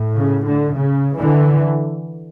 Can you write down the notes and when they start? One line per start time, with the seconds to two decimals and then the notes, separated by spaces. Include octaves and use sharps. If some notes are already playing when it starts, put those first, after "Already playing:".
Already playing: A2
0.15 C#3
0.45 D3
0.75 C#3
1.18 D3 E3